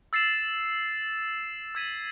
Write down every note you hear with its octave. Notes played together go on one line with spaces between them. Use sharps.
E6 A6 C7 E7
E6 G#6 B6 D#7